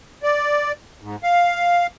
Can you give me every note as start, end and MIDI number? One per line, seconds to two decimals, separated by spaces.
0.23 0.72 74
1.01 1.16 44
1.23 1.87 77